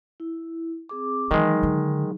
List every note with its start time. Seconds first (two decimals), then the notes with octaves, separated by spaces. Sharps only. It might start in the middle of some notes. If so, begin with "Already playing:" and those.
0.20 E4
0.89 C4 G#4 D6
1.31 D#3 E3 F#3 G#3 D#4 G#4
1.63 D3